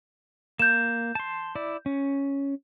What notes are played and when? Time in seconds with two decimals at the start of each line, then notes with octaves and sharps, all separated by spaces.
0.59 A#3 G6 E7
1.15 A5 C6
1.55 E4 D5
1.86 C#4